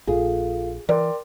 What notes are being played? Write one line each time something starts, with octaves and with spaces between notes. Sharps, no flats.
A#1 F4 G#4 A4 F5
E3 A#4 D5 G5 C6